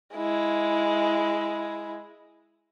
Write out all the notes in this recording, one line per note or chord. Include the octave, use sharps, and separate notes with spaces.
G#3 E4